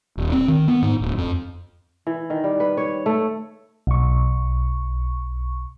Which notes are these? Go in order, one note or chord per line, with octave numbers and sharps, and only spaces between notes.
D#1
C4
D#3
B3
G#2
D1
F2
E3
D#3
G3
B4
C#5
A3
B1 C#6